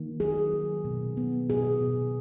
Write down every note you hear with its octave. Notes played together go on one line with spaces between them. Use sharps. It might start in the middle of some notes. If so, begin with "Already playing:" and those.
Already playing: D#3 A#3
F#3 G#4
D#3
B2
B3
B2 G#4
B2